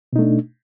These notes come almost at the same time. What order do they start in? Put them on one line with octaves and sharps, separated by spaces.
B2 D#4 A3 D4